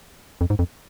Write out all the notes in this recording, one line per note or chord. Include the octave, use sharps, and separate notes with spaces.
F2
G#2
F2